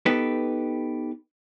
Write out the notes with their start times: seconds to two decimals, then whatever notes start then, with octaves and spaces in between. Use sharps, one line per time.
0.06 B3 D#4 G4 A4 B4